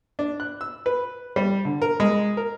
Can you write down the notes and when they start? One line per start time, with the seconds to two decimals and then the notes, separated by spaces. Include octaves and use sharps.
0.19 D4
0.40 F#6
0.61 E6
0.86 B4
1.36 G3
1.65 D3
1.82 A#4
2.00 G#3
2.37 A#4